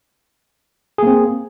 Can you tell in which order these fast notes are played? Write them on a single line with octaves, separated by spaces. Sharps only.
G#4 A#3 C4